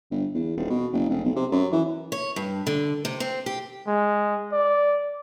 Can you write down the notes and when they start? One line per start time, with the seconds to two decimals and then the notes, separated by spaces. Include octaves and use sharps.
0.11 G1
0.34 E2
0.57 D#1
0.70 B2
0.93 F#1
1.10 F1
1.24 B1
1.36 C3
1.52 F#2
1.72 E3
2.12 C#5
2.36 G2
2.67 D3
3.05 C3
3.20 C4
3.46 G4
3.87 G#3
4.52 D5